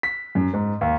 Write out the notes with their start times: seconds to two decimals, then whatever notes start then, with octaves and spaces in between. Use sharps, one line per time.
0.03 B6
0.35 F#2
0.54 G#2
0.81 D#2